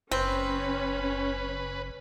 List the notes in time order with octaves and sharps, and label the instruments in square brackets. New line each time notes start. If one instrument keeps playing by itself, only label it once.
[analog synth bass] F#1 [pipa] C4 [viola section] C#4 [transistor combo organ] B4